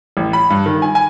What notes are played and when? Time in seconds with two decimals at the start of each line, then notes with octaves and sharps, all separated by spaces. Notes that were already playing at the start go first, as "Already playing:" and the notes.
0.17 A1
0.33 B5
0.50 G2
0.66 D#3
0.82 G#5
0.95 G#5